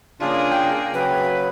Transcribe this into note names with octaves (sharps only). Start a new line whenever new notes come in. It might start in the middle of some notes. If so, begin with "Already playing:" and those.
C#3 A#3 D4 F4 G#4
G5
C#3 F#3 B4